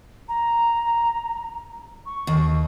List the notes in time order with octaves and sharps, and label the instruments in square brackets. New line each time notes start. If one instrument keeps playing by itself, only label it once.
[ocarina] A#5
C#6
[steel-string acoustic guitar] D#2